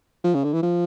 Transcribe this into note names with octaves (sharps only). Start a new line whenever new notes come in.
F3
C#3
D3
E3
F3